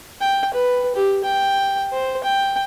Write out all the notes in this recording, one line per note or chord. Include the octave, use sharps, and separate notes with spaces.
G5
B4
G4
G5
C5
G5